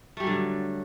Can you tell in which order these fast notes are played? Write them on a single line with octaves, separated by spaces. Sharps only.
A3 G3 F#3 D3